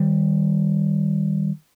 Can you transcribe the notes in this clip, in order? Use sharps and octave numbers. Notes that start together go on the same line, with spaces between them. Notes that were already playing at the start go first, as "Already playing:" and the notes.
Already playing: D#3 G3